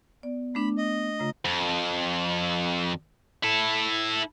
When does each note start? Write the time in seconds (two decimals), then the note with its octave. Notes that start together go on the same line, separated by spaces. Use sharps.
0.23 B3 D5
0.55 A3 D4 B5
0.78 D#5
1.19 C#3 A3 F4 A#5
1.45 F2
3.43 E4 A4